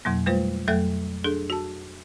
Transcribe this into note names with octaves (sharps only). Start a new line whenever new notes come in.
F2 B2 F#3 A#3
G3 A3 F4 B4 C5
F2 F#3 A3 A4 E5 F#6
D4 G#4 A4
F#4 A5